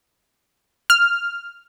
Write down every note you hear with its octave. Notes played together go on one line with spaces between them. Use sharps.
F6